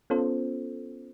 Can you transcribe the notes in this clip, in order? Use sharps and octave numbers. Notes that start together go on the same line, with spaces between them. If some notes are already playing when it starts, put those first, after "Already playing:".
B3 C#4 F4 A4 C5